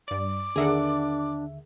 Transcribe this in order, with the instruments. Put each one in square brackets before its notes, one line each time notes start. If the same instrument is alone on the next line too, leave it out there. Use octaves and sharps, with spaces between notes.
[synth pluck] G2 D5 [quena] D6
[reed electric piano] D#2 D3 E5 [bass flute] D4 [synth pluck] G#4 A#4 F#5